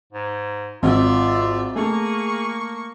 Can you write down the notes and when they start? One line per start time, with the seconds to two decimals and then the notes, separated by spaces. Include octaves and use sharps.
0.13 G#2
0.83 G#1 F4 D5 E5
1.76 A3 A#3 G#4 C#6